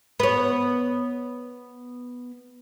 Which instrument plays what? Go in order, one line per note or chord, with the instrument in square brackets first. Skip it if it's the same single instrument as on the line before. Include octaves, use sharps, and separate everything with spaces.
[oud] B3 C#5